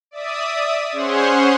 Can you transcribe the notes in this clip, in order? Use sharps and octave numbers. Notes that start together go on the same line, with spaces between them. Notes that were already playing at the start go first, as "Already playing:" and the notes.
D5 E5 D#6
C#4 G#4 C5 C#5 F#5 C6